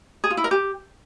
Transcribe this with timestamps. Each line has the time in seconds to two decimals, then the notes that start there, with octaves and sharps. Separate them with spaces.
0.24 G#4
0.30 F4
0.37 E4
0.44 A#4
0.51 G4